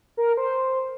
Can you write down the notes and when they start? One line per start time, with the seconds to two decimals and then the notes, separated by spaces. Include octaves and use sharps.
0.17 A#4
0.37 C5